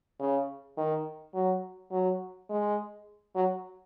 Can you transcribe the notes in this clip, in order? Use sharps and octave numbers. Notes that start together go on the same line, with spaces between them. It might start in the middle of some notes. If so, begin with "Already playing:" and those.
C#3
D#3
F#3
F#3
G#3
F#3